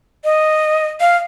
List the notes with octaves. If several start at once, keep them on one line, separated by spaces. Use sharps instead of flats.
D#5
F5